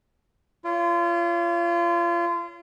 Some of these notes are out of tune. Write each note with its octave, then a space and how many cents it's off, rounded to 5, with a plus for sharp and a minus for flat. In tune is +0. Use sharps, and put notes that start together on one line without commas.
F4 -30 C#5 +25